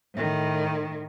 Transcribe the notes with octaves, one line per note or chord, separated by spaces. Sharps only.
A2 D#3